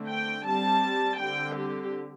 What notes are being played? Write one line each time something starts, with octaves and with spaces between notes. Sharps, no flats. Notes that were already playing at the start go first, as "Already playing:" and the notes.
Already playing: D3 A3 C4
G5
G3 C4 A5
D3 G3 C4 G5
G4